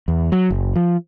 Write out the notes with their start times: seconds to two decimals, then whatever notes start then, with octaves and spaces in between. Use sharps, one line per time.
0.08 E2
0.32 F#3
0.50 F#1
0.76 F3